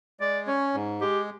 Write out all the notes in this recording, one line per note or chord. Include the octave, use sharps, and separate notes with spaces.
G#3 D5
C#4 C#5
G#2
G#3 G4